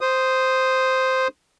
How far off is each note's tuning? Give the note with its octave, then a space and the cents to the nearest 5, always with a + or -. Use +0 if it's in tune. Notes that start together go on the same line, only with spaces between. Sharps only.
C5 -5 D#6 +0